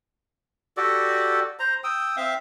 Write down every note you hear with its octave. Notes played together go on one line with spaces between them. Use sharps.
F#4 G4 A4 D5
C5 A#5
G5 D#6 E6
C4 E5 F5